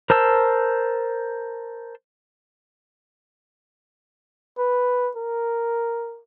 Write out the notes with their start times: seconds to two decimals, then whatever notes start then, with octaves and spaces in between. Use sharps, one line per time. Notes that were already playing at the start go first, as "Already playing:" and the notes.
0.10 A#4 C5 A5 E6
4.58 B4
5.17 A#4